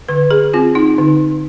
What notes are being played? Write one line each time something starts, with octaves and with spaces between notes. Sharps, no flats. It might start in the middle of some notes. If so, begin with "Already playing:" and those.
D3 B4
G#4
C4 F4
D#4
D3 D#4